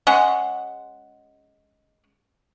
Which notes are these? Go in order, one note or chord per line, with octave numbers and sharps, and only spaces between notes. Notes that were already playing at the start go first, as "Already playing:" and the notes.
G#3 C#4 F#5